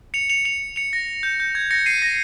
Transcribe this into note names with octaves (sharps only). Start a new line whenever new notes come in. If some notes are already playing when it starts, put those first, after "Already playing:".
C#7 F7
C#7 F7
C#7 F7
C#7 F7
A#6
G6
G6
G#6
A#6 C#7
C7 D#7
A#6